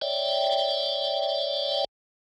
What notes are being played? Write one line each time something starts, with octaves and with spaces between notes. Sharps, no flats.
C#5 D5 E5 G5